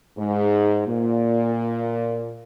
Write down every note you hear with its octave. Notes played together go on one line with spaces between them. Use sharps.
G#2
A#2